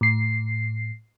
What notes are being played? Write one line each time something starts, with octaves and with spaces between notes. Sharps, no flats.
A2 C7